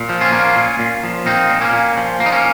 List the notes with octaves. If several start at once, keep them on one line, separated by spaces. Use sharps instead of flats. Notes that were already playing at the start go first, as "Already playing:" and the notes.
Already playing: A#2
F3
C#4 F4
A#3
A#2
A#2
F3
A#3 C4 D#4
A#2
A#3 C#4
A#2
F3
A#3
D#4
A#3 C#4